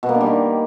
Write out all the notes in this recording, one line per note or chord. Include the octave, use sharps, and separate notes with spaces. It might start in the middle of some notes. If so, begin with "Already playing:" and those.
B2
A#3
D4
G3
D#3